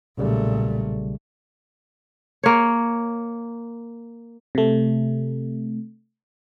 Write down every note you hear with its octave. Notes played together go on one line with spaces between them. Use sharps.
B1 A#2 C#3 G3 A3
A#3 C#5
C3 A3